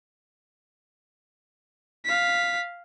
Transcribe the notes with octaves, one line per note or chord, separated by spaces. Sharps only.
F5 B6